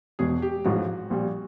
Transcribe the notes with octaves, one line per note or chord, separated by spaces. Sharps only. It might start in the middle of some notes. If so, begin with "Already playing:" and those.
E1 E2 B2 G#3 G#4
G4
A1 G#2 F3 F#4
A#1 A#2 G3